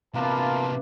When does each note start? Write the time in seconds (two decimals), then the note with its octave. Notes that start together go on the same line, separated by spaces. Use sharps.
0.14 C3 E3 A#3 B3 D4 F4 A#4 A5